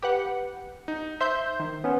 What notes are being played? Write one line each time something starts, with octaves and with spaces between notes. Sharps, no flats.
G4 B4 F#5
D#4
C5 E5 C6 G6
D#3
B3 C#4